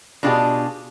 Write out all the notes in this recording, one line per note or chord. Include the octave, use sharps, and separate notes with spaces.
B2 D4 F4 G4 G#4